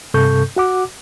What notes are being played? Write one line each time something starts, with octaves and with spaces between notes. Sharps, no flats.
G2 C3 A4 C#6 G6
F#4 F#5 D6